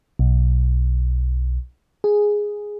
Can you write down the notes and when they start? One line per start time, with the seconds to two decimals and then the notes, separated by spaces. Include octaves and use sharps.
0.19 B1
2.04 G#4